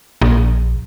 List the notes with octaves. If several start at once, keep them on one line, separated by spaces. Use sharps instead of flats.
A#1